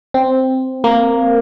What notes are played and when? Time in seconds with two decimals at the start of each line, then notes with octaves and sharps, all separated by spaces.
0.14 C4
0.84 A#3